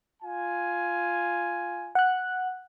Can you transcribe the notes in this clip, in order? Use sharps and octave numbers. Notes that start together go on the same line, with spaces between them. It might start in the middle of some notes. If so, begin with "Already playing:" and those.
F4 G#5
F#5 F#6